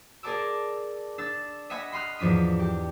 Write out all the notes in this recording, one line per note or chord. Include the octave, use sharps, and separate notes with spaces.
G#4 A#4 D5 A5 D6 E6
D4 E6 A6
D#5 E5 F#5 G#5 B5 E6
B5 C6 D#6 F6 F#6
E2 G#2 F3 D4 B6 D#7
G4